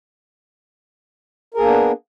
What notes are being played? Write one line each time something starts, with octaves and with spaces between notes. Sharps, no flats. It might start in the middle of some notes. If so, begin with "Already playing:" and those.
A#3 B3 D4 G#4 A#4